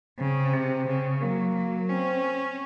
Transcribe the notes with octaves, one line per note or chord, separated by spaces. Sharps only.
C#3 C4
C3
C#3
F#3 A#3
F#3
C4 C#4